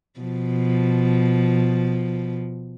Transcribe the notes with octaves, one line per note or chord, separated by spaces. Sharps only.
B2 F3